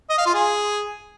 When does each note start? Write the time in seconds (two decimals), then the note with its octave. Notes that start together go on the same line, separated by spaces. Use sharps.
0.10 D#5
0.18 F5
0.26 F4
0.34 G#4